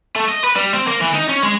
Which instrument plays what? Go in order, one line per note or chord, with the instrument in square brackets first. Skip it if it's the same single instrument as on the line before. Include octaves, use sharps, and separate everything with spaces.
[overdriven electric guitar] A3
D#5
B4
G3
C4
A#3
E3
D#4
C#4
G#3